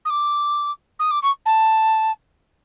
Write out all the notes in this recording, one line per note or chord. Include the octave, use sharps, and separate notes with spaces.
D#6
D6
D#6
D6
C#6
A5